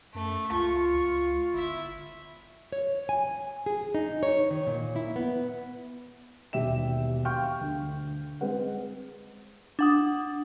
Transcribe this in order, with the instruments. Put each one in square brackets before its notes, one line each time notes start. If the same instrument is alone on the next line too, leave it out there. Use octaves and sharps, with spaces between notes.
[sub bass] F#2 [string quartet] A3
[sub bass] C#2 [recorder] F4 [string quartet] C#6
[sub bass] C#2
[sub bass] G1 [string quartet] E4 E5
[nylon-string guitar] C#5
G#5
G#4
D#4
C#5
D#3
A#2
E4
B3
[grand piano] E1 D#2 G4 E5 G5 E7
F5 G5 C6 C#6 F6 G6
D2
G#3 C4 B4 F#5
[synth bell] D4 F#5 D#6